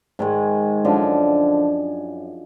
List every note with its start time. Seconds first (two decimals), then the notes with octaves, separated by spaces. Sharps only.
0.19 G#2 D#3 G#3
0.85 F#2 D3 F3